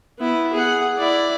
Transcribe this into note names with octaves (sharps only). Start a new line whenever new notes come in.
B3 E4
G#4 F#5
E4 D5